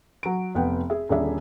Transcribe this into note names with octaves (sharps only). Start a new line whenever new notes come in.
F#3 D7
F1 B3 F#5 G5
G#4 E5
D#1 D3 G#4 D5 E5